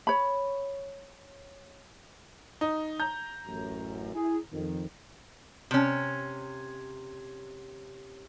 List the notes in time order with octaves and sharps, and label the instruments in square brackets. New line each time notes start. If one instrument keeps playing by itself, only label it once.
[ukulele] C#5 B5
[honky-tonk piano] D#4
A#5 G6
[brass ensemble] A1 F#2
E4 G#4
F2 D#3
[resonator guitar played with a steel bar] C3 C#4